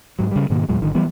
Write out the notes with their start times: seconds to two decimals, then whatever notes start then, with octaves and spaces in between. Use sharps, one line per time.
0.19 G#2 F#3
0.31 C#3 G3
0.50 G#2 B2 D#3 A#3
0.69 E2 A#2 F#3 G#3
0.81 G#1 D3 D#3
0.95 E3 F#3 G3 B3